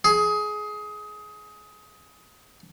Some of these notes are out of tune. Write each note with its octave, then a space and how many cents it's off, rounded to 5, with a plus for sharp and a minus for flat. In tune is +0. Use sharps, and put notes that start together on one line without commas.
G#4 +20